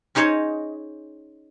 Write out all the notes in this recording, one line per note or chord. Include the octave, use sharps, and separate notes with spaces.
C#4 D#4 G#4 C5 C#5 D#5